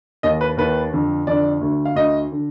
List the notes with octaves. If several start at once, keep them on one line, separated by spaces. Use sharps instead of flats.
D#2 D#3 D#5
B4
D#2 D#3 B4
F2 D3
F2 D3 D5
D2 D3
F5
D2 D3 D#5
D3